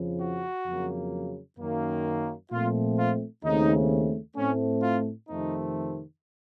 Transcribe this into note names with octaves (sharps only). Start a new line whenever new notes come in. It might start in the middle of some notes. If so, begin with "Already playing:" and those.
Already playing: F2 C#3 F3
F#4
F2 C#3 F#3 A#3
F#2 D#3 A#3
A#2 F3 A3 C4 F4
F4
D#2 C#3 A3 C4 D#4
A2 A3 C4 C#4
F4
F2 C3 D#3 A3 C4 D#4